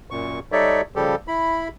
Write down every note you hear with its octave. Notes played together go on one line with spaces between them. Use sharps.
F#2 A#2 C#6
G3 D#4 A4 C#5 D5 E5
C#3 F3 G3 G4 A4
E4 B5